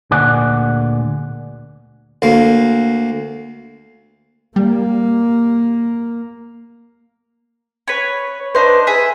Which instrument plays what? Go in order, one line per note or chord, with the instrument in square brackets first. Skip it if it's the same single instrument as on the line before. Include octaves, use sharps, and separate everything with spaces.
[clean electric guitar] D2 A#2 G#4 D5 F#5
[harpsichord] D2 A#3
[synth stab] G3 [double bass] A#3
[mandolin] B4 C#5
[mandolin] D4 D#4 C5 [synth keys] B4
[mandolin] G#4 E5